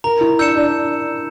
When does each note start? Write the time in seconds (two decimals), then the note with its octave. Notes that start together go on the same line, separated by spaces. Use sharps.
0.04 A#4 A#5
0.21 E4
0.39 D4 E6 G6 C#7 E7
0.55 D4